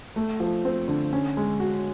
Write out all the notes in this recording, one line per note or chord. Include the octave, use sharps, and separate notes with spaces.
A3
F3
C4
D3
C#4
G#3
F#4